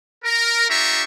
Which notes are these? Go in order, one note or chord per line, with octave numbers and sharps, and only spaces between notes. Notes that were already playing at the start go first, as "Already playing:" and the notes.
A#4
D4 F4 G4 E5 A#5 C#6